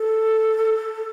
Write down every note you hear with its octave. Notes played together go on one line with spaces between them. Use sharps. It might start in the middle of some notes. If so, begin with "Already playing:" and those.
Already playing: A4